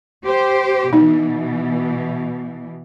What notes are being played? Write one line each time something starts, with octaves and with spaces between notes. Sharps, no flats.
G4 C5
B2 E3 D#4